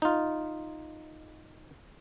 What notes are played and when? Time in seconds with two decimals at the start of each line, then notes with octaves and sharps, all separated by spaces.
0.02 D#4 F4